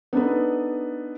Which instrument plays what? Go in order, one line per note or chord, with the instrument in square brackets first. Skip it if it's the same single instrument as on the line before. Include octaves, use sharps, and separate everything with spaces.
[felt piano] B3 D4 D#4 A4 B4